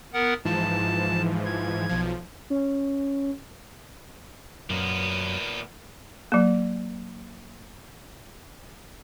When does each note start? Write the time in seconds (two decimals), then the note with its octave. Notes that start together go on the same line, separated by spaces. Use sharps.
0.14 B3 A#4 F#5
0.45 G#2 E3 F3 A5
1.45 G#6
1.89 B1 F3
2.50 C#4
4.70 F#2 A#2 B3
6.32 F#3 A#3